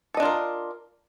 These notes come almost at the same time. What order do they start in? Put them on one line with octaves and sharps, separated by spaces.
A4 D#5 D4 F4 A#4